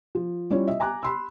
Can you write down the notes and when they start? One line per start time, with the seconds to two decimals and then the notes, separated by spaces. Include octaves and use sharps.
0.15 F3
0.50 G3 C#4 E4 F4 G4 C#5
0.68 D#5 E5
0.80 G#5 A#5 D6 F#6
1.03 B5 C6 E6